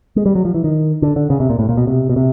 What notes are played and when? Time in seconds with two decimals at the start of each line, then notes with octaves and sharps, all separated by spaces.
0.16 G#3
0.26 G3
0.35 F#3
0.45 F3
0.54 E3
0.64 D#3
1.02 D3
1.16 D3
1.30 C#3
1.40 C3
1.50 A#2
1.59 A2
1.69 A#2
1.77 B2
1.87 C3
2.09 B2
2.16 C3